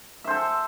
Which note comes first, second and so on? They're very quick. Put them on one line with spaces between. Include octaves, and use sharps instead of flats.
E5 C5 A4